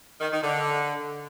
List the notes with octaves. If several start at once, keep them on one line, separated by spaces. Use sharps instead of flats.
D#3
D#3
D3